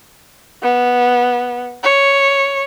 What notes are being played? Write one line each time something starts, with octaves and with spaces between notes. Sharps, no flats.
B3
C#5